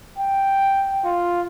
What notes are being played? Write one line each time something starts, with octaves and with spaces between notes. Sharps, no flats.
G5
F4